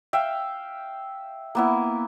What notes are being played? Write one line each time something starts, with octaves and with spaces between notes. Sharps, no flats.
E5 F5 G5
A#3 B3 E4